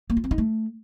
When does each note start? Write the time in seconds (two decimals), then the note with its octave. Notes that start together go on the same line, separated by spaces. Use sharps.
0.10 A#3
0.17 F4
0.24 C4
0.31 D#4
0.38 A3